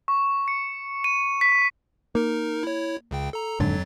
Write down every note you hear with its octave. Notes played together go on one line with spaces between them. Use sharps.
C#6
C#7
D#7
B6
A#3 D#4 A#4
E4 C#5
C#2 C#3 G5
A4 A#5
D#1 F2 G#2 D3 F#3 A6